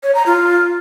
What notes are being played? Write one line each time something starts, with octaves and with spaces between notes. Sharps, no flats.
C#5
A#5
F4